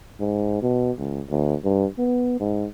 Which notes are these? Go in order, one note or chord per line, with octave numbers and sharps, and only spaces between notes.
G#2
B2
C#2
D2
G2
B3
G#2